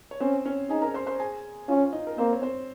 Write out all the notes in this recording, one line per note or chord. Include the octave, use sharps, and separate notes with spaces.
C#5
C4 C#4 C5
C#4 C#5
D#4 G#4 G#5
A#4 A#5
C5 C6
C5 C6
G#4 G#5
C#4 F4 F5
D#4 D#5
A#4
A#3 C4 C5
C#5
C4 C5